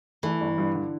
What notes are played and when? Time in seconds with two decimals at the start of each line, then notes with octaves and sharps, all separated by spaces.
0.23 E3 A3
0.41 G1
0.58 G2
0.75 D3